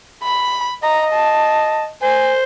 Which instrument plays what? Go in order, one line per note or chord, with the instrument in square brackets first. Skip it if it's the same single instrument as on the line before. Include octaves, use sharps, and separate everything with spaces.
[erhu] B5
[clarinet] D#5 [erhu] A#5
[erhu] A5
[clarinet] C5 [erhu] G#5